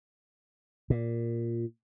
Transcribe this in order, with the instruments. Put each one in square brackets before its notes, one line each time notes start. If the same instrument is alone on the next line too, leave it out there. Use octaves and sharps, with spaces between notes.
[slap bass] A#2